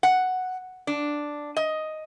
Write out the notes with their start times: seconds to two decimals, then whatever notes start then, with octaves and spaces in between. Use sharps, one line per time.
0.03 F#5
0.87 D4
1.57 D#5